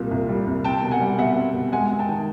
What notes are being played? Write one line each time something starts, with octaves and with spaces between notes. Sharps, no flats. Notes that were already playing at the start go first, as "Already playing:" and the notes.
Already playing: C2 A#2 G3
C2
G3
C2
C4 G5 A5
B2
F#5 G#5
G3
B2 E5 F#5
C4
B2
G#3 F#5 G#5
C3
G5 A5
D#3